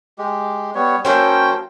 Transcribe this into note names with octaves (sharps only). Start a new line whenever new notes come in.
G#3 G4
G3 B3 C#5
F#3 A#3 C#4 A4 C5 G5